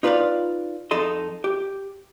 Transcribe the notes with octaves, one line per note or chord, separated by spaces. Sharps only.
D#4 F4 B4 C#5 D5 F5
F2 D#4 A4 D#5 C6
G4